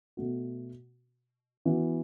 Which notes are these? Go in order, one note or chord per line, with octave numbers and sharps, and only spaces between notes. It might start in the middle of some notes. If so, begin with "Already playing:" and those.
B2 A3 F#4
E3 B3 F#4